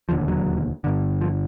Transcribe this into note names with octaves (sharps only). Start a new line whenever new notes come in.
E1 D#2 D3 F3
F#3
G1 G2 D3
F3